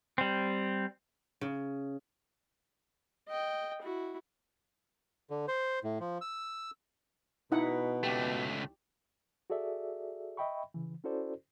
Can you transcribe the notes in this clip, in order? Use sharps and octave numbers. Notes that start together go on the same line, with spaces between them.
G3 C4
C#3
D#5 G5
E4 F#4
D3
C5
A2
F3
E6
B2 D#4 E4 F#5
C#2 A3 G4
F#4 G#4 A4 D5 E5
D#5 E5 G5 B5 C#6
C#3 E3
C#4 E4 F#4 A4 C5 D5